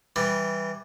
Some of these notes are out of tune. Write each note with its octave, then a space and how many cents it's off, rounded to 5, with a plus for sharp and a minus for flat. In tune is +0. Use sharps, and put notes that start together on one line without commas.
E3 -5 G3 +0